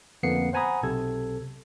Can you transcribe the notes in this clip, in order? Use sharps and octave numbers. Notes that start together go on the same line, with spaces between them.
F2 D3 A#3 B3 C7 C#7
C5 F#5 G#5 A#5 B5 D#6
B1 C3 A4 G#6